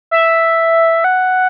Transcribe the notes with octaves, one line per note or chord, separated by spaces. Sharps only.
E5
F#5